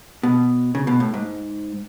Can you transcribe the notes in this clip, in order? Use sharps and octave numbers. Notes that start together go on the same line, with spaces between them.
B2
C#3
B2
A2
G#2